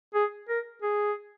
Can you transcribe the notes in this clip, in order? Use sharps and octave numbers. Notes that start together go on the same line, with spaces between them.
G#4
A#4
G#4